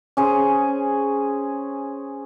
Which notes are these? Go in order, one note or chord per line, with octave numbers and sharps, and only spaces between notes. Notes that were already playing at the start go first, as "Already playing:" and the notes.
C#4 G#4 C5